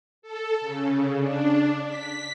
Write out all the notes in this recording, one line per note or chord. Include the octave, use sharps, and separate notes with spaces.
A4
C#3
D4
B6